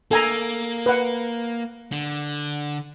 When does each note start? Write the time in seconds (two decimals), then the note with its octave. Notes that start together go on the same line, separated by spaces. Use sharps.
0.11 A#3 A4 G#5 A#5
0.86 B4 F#5
1.92 D3